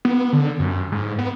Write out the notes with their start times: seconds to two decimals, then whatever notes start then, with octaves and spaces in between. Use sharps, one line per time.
0.05 B3
0.33 D3
0.59 F#2
0.92 G#2
1.19 B3